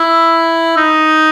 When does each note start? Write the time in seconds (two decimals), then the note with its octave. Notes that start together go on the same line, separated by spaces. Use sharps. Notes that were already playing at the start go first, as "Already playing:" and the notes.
Already playing: E4
0.77 D#4